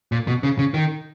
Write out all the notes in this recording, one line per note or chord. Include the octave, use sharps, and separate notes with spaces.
A#2
B2
C#3
C#3
D#3